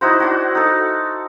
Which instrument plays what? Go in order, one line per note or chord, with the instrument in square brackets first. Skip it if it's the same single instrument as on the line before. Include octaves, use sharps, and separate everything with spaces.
[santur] D#4 E4 F#4 C5
D4 F#4
D#4 A4